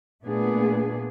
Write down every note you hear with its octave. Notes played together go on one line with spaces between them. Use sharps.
A#2 A3 B3 D4 G#4